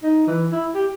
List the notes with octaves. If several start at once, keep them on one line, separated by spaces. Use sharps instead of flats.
D#4
E3
E4
G4